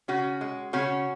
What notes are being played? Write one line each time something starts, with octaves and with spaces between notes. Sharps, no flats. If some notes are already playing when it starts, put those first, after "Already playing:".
C#3 C#4 F#4
G#3
C#3 C#4 F#4